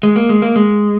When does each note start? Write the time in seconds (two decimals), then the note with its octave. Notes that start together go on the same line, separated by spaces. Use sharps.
0.03 G#3
0.16 A#3
0.29 G#3
0.42 A#3
0.56 G#3